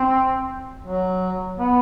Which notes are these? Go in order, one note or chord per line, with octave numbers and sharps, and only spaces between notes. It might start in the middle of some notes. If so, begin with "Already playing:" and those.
Already playing: C4
F#3
B3